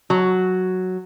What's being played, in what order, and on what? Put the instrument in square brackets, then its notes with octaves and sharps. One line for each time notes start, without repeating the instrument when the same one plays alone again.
[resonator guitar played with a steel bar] F#3